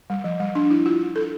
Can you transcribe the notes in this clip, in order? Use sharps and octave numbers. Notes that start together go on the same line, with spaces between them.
G3
F3
G3
D4
E4
F4
A4